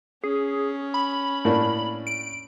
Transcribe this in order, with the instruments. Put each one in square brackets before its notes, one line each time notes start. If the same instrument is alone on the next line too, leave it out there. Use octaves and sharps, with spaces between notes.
[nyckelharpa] C#4 [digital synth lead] G#4
[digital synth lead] B5
[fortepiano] A2 A#3 D4
[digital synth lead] D7